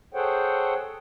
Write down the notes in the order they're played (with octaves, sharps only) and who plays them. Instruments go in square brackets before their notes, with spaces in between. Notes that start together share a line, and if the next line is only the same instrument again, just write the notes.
[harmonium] G#4 A4 C5 C#5 F#5 G5